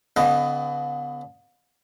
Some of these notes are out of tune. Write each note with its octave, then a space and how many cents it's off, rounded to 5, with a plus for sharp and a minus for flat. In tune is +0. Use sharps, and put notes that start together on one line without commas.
D3 -40 B3 +20 D#5 +0